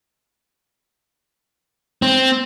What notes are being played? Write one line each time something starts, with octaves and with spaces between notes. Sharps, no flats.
C4